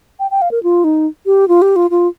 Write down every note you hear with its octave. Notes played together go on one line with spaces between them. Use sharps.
G5
G5
F5
A#4
F4
D#4
G4
F4
G4
F4
F4